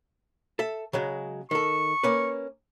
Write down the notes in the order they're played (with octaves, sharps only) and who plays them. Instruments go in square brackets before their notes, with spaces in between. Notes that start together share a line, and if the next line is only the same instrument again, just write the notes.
[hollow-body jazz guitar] A4 E5
C#3 F#3 G#3
[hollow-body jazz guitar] D#3 A4 [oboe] C#6
[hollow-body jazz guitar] A#3 C#4 B4